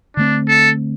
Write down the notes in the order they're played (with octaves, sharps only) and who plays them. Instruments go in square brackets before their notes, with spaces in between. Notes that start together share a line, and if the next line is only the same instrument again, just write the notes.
[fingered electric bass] D3 A3 C4 [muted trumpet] D4
[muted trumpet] A4